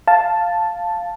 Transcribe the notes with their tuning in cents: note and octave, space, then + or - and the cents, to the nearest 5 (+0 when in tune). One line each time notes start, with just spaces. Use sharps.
F5 +0 A5 +0